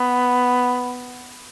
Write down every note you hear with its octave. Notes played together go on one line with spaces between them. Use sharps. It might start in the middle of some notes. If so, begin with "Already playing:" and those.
Already playing: B3